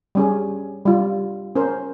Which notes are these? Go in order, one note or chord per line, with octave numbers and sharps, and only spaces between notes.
G3 C#4 G#4
G3 F4
C#4 A#4 C5